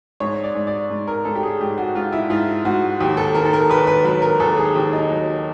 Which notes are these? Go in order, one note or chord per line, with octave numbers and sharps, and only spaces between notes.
G#2 C#5
D5
G#2
D5
G#2
A#4
G#2 A4
G4
G#4
G#2 G4
F#4
G#2 F4
E4
G#2 F4
G#2 F#4
D#2 G4
A4
D#3 A#4
A4
A#4
D#2 B4
B4
F#3 B4
A#4
D#2 A4
G#4
D#2 G4
D#4
F#3